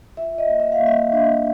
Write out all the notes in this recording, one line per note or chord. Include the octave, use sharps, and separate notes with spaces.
F4 E5
D#5
A#3
E5
F5
A#3
E5
D4